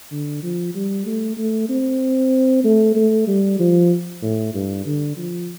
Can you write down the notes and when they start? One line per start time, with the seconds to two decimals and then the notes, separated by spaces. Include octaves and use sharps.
0.12 D3
0.43 F3
0.75 G3
1.06 A3
1.37 A3
1.69 C4
2.64 A3
2.96 A3
3.27 G3
3.59 F3
4.22 A2
4.54 G2
4.85 D3
5.17 F3